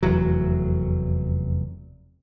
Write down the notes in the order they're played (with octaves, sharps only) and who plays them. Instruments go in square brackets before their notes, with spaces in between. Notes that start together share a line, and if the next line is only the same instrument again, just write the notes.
[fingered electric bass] F1 E2 F#3